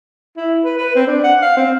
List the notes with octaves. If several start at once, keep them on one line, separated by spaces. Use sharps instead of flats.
E4
B4
B4
C4
D4
F#5
F5
C4